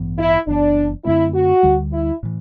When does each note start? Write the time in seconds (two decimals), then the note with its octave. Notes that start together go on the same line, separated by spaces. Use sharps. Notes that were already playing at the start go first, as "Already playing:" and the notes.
Already playing: A1 G2 E3 B3
0.18 E4
0.47 F#1 F#2 E3 B3 D4
1.05 F#2 D3 A3 C4 E4
1.34 F#4
1.63 D2 D3 G3
1.93 E4
2.23 A2 E3